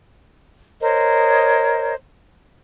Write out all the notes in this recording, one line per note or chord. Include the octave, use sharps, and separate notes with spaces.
A#4 C5 C#5 D#5